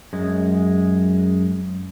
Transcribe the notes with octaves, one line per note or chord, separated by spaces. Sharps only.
F#2 G#3